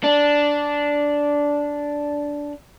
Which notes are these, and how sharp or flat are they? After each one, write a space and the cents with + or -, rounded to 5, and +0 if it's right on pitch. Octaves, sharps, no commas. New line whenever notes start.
D4 -10